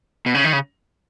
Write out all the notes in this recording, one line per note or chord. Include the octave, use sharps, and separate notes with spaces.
B2
C#3
D#3
C#3